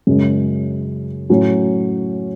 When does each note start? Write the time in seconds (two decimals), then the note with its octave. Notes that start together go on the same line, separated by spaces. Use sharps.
0.07 F#2 C#3 G#3
1.29 A2 F#3 C#4